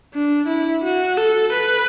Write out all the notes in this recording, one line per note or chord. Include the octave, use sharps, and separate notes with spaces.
D4
E4
F#4
A4
B4